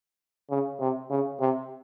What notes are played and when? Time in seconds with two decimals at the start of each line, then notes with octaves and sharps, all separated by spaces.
0.50 C#3
0.80 C3
1.11 C#3
1.40 C3